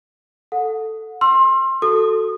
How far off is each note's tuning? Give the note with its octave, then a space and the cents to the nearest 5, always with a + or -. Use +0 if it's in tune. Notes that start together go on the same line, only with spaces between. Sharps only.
A4 +0 F#5 -30
C6 +25 E6 +30
F#4 +0 A4 +0 D#6 -30